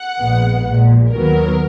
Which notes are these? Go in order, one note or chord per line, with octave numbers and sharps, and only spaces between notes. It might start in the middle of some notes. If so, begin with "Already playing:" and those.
Already playing: F#5
A#1 A#2 G#3 B3
A#1 A#2 G#3
D#2 D#3 F#3 B3 A#4